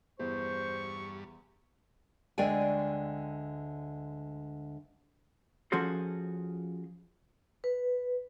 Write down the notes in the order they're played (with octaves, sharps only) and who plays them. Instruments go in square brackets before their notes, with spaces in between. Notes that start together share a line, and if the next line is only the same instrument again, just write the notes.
[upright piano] E2 [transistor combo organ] G2 [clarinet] C5 [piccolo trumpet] C#6
[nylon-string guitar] D2 D3 G#3 D5 G5 G#5
[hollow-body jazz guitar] F3 C#4 F#4 G#4 A4 C5
[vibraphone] B4